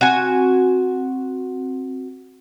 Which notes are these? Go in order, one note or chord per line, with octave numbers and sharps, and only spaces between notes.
C4 F#4 G#5